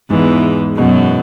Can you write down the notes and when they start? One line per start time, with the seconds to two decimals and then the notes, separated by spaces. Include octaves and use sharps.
0.10 E2 G#2 E3
0.77 F#2 B2 F#3